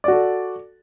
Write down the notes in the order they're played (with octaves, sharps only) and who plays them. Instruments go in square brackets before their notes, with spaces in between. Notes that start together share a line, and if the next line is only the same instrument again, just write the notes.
[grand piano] D5
F#4
A4